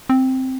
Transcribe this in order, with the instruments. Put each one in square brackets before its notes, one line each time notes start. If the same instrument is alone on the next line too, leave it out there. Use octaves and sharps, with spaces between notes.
[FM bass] C4